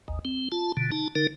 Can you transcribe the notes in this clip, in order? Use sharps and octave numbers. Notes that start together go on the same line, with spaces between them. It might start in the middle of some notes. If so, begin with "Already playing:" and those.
G#1 D#2
C4
F4 A5
B2 D3
D#4 A5
D3 D#4 A#4